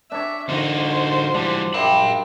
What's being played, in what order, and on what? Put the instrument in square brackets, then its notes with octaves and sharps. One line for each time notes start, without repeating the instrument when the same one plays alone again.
[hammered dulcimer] D4 C#5 [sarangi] E5
[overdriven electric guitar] D3 D#4 [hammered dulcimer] F4 F#4 [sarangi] C5
[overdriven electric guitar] E3 G3 [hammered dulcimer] D4
[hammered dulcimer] F#2 G3 C6 [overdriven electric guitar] F5 B5